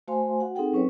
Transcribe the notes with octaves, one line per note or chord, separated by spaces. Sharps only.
A3 F#4 C5 F5 G#5 C6
F#4 F#5
C4 D#4 G#4 A4 F#5 G5
F#3 C4 C#4 B4 C#5